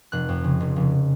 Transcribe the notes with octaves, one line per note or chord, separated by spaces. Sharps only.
F1 F#6
F2
C#3
F1
F1